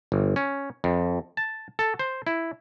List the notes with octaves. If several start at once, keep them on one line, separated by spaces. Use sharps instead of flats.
G1
C#4
F2
A5
A4
C5
E4